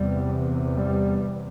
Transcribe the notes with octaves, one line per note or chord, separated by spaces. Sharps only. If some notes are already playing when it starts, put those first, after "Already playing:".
Already playing: E2 C3 G3
G3